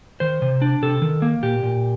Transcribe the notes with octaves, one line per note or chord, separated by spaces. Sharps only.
D#3 C5
C3
D4
C3 A4
D#3
A#3
A#2 G4
A#2